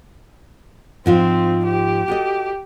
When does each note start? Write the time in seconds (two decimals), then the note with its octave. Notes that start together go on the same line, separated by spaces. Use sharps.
1.06 G#2 F3 C4 F4
1.65 G4
2.08 F#4 A4 D#5